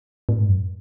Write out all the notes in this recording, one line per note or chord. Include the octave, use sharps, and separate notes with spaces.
A2
G#2
F#2